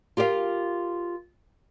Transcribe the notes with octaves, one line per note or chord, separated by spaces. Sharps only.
F4 G4 A#4 D5 F5